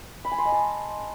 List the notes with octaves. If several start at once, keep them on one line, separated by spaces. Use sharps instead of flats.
B5
G#5
C6
D#5
A5